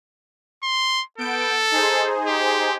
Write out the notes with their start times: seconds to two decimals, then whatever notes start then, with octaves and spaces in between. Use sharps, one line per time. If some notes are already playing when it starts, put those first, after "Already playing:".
0.63 C6
1.18 B3 A4 G6 D7
1.71 D#4 G#4 C5
2.27 G4